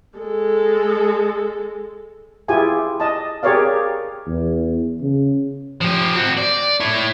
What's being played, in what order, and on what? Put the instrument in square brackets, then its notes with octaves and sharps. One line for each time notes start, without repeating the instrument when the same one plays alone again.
[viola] G#3 A4
[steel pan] E4 F4 G4 G#4 G#5
D#5 A5
G4 G#4 A#4 C#5 D5 F5
[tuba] E2
C#3
[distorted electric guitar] F3 G4
C4 F#4
D5
E4 C#5